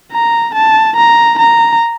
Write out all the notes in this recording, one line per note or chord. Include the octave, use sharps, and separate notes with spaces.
A#5
A5
A#5
A#5